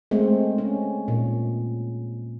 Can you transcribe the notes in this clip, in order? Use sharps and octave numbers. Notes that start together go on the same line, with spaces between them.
G#3 A3 C4
C#4
A#2